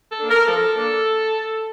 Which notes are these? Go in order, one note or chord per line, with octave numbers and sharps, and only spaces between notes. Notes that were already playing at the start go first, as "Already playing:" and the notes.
A4
A#3 D4
A#4
F3 A4
A#3 D4